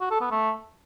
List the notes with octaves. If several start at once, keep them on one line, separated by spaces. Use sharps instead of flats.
F#4
A4
B3
A3